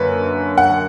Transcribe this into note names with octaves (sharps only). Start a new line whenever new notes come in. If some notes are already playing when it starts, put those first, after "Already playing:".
Already playing: F#2 D3 A#3 B4
F#5